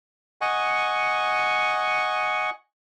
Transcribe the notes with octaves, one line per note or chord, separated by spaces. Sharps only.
D#5 F#5 G#5 C#6